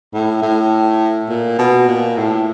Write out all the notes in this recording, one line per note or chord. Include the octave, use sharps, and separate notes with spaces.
A2
A2
A#2
B2
A#2
A2